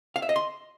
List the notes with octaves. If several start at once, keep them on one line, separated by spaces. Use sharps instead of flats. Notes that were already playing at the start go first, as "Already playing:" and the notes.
F5
E5
D#5
C6